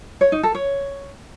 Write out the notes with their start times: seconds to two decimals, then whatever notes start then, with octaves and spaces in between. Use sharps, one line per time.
0.21 C#5
0.32 D#4
0.43 A4
0.55 C#5